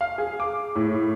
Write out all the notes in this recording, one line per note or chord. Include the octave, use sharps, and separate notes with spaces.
F5
G#4
D6
A2